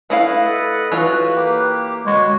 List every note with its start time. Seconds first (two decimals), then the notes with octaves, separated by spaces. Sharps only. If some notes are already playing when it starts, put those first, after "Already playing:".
0.10 A3 E4 B4 D#5 F5 F#5
0.45 A4
0.92 E3 F4 F#4 B4
1.36 A#3 G4
2.06 G#3 F#4 C#5